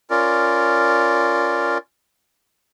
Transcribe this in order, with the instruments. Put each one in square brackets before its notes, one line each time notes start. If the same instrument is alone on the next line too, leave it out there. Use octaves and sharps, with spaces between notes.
[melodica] C#4 F4 A#4 D5